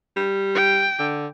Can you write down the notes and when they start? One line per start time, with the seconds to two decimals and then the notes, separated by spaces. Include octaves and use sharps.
0.16 G3
0.55 G5
0.99 D3